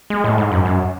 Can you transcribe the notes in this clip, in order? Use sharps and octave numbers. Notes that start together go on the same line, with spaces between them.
G#3
A2
G#2
F#2
F#2